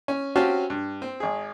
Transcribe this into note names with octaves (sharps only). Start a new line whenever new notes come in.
C#4
C4 C#4 F#4 G4 F5 A5
G2
C4
G#1 G#4